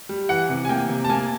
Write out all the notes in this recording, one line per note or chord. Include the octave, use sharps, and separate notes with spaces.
G3
E3 F#5
C3
G#5
A#3 G5
C3
A5
A#3 G#5